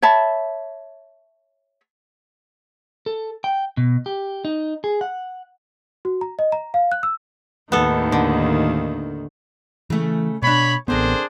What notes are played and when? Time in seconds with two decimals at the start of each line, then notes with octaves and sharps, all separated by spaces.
0.02 C#5 E5 A5 B5
3.06 A4
3.44 G5
3.77 B2
4.06 G4
4.45 D#4
4.84 G#4
5.01 F#5
6.05 F#4
6.21 A#5
6.39 D#5
6.52 A#5
6.74 F5
6.92 F#6
7.03 E6
7.72 D#2 A2 D#3 B3 A4
8.12 D3
9.90 C#3 E3 A3
10.43 B2 B3 D4 C#5 B5
10.88 A1 D3 B3 C4 D4 G#4 A#4 C5